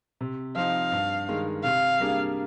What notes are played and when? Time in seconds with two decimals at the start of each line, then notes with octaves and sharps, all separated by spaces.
0.21 C3
0.56 F3 C4 D#4 F5
0.92 G2
1.28 D#3 G#3
1.63 C3 F5
1.99 G3 A#3 D4 G#4